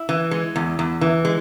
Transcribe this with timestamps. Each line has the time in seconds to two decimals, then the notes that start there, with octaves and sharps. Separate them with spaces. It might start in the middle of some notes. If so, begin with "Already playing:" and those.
Already playing: E4
0.09 E3
0.31 G#3
0.56 E2
0.79 E2
1.01 E3
1.25 G#3